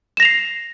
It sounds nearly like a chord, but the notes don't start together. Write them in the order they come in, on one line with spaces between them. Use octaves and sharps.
E7 A#6 F7 C7